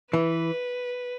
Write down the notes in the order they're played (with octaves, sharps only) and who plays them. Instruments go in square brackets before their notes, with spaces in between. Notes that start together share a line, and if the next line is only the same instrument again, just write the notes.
[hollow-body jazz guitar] E3 [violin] B4